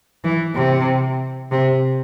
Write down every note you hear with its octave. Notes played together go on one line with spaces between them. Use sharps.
E3
C3
C3